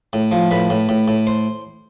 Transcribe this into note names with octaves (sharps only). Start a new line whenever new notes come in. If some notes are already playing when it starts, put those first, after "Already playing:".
A2
F3
A2 B4
A2
A2
A2
C5